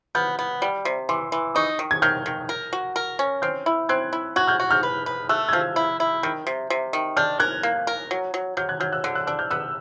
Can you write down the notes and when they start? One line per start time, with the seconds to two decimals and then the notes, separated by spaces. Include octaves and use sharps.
0.15 B3 F6 G6
0.39 B3
0.62 G3
0.85 C3
1.09 E3 C6 D6
1.32 E3
1.55 D#4 C#6 D#6
1.79 D#3
1.91 G#6
2.02 D#3 F6 G6
2.26 D#3
2.49 A#4
2.73 F#4
2.96 A#4
3.19 C#4
3.42 C4 F6 G6
3.66 E4
3.89 C4 F#6 G#6
4.13 E4
4.36 F#4 F#6 G#6
4.47 F6 G6
4.60 F#4
4.71 F6 G6
4.83 B4
5.06 B4
5.29 A3 E6 F#6
5.49 G#6
5.53 F3 F6 G6
5.76 E4
6.00 E4
6.23 D#3 F6 G6
6.47 C3
6.70 C3
6.93 D#3
7.17 D4 F6 G6
7.40 A#4 F#6 G#6
7.63 A#3
7.87 A#4
8.11 F#3
8.34 F#3
8.57 F#3 F6 G6
8.69 F#6 G#6
8.80 F#3 F6 G6
8.93 E6 F#6
9.04 D3 E6 F#6
9.15 E6 F#6
9.27 D4 E6 F#6
9.39 F6 G6
9.51 B3 E6 F#6